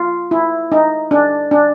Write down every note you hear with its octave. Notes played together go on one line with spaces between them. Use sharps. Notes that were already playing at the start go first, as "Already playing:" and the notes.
Already playing: F4
E4
D#4
D4
D4